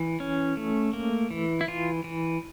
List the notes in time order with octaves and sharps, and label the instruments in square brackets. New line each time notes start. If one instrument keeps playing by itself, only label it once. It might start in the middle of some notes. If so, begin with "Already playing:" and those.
Already playing: [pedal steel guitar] E3
C#4
A3
A#3
E3
E4
E3 F4
E3